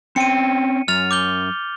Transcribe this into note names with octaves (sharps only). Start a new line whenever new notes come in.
C4 C#4 G5 C#7 D#7
F#2 F6 A6 F7
D6 G6 G7